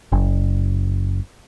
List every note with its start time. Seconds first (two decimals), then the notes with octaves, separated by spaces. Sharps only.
0.12 F#1